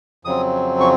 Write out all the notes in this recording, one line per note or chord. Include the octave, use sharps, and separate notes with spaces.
F2 C#3 F#3 C4 D#6
C#6